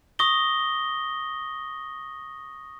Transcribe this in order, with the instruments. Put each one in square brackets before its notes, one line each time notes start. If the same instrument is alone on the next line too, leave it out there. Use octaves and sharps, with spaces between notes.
[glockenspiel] C#6 D#6 A#6 G7